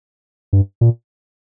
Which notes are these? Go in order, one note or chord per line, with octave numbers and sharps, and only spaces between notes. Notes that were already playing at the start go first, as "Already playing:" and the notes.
G2
A#2